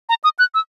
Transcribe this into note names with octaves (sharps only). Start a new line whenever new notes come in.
A#5
D#6
F#6
E6